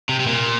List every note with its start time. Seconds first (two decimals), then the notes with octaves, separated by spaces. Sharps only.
0.09 C3
0.20 C3
0.27 A#2